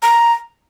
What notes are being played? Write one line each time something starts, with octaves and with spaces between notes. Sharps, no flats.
A#5